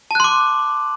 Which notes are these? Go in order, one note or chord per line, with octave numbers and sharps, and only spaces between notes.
A5 C6 D6 F#6